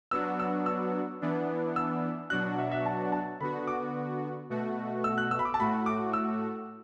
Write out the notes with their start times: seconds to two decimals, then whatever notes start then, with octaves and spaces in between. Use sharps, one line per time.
0.11 F#3 B3 D4 F#4 E6
0.40 E6
0.66 E6
1.21 E3 B3 D4
1.76 E6
2.30 B2 F#3 D4 F#4 F#6
2.58 E5
2.71 E5
2.86 A5
3.12 A5
3.40 D3 B3 F#4 B5
3.67 D6
4.50 B2 A3 F#4
5.04 E6
5.18 F#6
5.31 E6
5.39 B5
5.45 D6
5.54 A5
5.60 A2 A3 F#4 B5
5.86 D6
6.13 E6